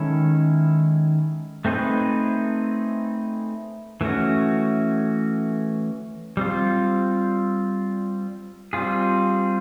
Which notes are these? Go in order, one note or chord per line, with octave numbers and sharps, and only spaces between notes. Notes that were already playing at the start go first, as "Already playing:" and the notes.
Already playing: D#3 G#3 C#4 E4 A4
A3 C4 D#4 G#4 B4
E3 A3 C#4 F#4
G3 C4 F4
G3 C4 F4 G#4